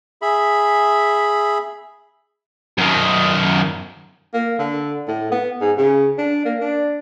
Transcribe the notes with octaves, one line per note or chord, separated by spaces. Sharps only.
G#4 E5 B5
F#2 D#3
A#3
D3
A2
B3
G#2
C#3
D4
A#3
D4